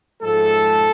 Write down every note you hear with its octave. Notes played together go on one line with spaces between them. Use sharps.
G#2 F3 G#3 A4